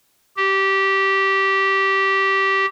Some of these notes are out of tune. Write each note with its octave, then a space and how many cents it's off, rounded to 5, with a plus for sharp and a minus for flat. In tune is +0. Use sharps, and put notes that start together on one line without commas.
G4 -15